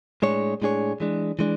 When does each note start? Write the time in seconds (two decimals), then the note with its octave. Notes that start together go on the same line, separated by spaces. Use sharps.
0.22 A2 G#3 D4 G#4 C#5
0.62 A2 G#3 D4 G#4 C#5
1.00 E3 G#3 D4
1.39 E3 G#3 D4